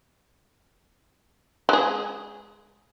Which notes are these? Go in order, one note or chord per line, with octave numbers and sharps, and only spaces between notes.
G#3 G#4